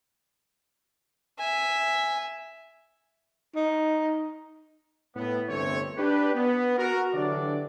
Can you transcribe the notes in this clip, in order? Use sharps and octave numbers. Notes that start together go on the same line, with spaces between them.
E5 G#5
D#4
A2 B3
G1 C2 A3 C4 C#5
D4 G4 B4
B3
F#4 A#4
D3 E3 F#3 D4 G4 D5